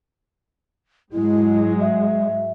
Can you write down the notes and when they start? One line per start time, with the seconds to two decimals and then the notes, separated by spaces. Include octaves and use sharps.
1.13 G#2 F#3 G#3 E4
1.81 E5